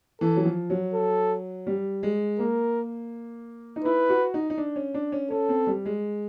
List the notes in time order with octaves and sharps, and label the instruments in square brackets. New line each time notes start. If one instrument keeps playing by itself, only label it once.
[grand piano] E3 [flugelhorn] A4
[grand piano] F#3
F3
F#3
[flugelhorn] A4
[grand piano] G3
G#3
[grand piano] A#3 [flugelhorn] A#4
[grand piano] D#4
[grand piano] E4 [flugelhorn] B4
[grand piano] F#4
D#4
D#4
D4
C#4
D4
C#4
[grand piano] C#4 [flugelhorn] A4
[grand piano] C4
G3
G#3